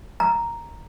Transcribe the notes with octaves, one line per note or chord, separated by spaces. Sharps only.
A#5